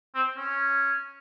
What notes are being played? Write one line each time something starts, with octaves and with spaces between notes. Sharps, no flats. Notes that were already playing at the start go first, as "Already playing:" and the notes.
C4
C#4